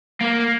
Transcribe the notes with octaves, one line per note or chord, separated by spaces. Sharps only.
A#3